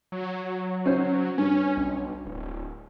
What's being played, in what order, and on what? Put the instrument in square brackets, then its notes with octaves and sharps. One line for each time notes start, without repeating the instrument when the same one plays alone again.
[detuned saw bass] F#3
[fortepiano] C#4 C5
[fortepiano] G2 [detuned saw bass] C#4
[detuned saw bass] B1
D1